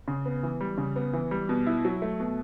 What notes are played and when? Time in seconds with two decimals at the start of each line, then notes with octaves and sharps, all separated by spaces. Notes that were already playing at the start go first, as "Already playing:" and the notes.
0.08 C#3
0.25 B3
0.43 E3
0.61 G3
0.78 C#3
0.96 B3
1.13 E3
1.31 G3
1.49 B2
1.66 E4
1.85 F#3
2.02 A3
2.20 B2